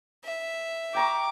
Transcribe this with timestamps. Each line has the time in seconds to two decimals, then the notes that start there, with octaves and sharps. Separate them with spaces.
0.25 E5
0.95 G5 A#5 C#6 D6